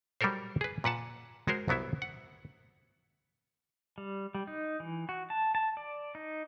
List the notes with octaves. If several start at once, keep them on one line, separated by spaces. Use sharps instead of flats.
F#3 G3 G4 A4 A#4 C5
G#4 B4
A#2 B4 F#5 A5
G#3 F#4 G#4 A#4 C5
C2 F#3 B3 E4 E5
F#5
G3
G3
D#4
E3
F#4
A5
A5
D5
D#4